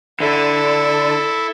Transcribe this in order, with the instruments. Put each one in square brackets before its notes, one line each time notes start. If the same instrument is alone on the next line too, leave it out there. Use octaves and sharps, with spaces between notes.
[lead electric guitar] D3 [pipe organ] E4 [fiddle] A4